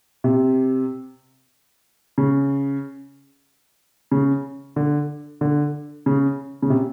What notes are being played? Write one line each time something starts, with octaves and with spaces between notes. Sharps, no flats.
C3
C#3
C#3
D3
D3
C#3
C#3
C3